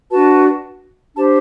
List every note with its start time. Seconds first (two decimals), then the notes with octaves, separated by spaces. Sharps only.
0.10 D4 F#4 B4 A5
1.16 D4 G4 C5 A5